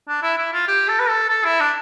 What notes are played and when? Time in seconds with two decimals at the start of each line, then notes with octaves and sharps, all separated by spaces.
0.08 D4
0.22 E4
0.38 E4
0.53 F4
0.68 G4
0.88 A4
1.00 B4
1.09 A4
1.28 A4
1.44 E4
1.60 D4